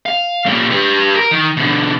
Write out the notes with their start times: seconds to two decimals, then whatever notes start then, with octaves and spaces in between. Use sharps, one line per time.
0.06 F5
0.46 A#2 C#4
0.71 G4 B4
1.16 A#4
1.31 D#3
1.57 B2 D3